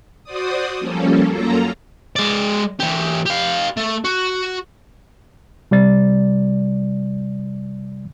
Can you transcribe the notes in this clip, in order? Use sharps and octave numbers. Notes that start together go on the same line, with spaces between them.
F#4 C5 D5 D#6
F3 G3 A#3 C#4 A4
F#2 F#3 A#3 F4 A4 A#5
G#3 D5
E3 G4
G4 F5
A3
F#4
C3 G3 D5 A6